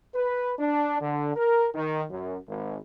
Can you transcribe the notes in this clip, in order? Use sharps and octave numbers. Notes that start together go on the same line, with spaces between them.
B4
D4
D3
A#4
D#3
F#2
G#1